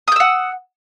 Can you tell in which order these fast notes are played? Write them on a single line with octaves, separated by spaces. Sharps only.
D#6 G6 E6 F#5